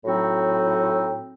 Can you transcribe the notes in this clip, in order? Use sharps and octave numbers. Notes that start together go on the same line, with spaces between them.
A2 F#3 C4 D#4 F#4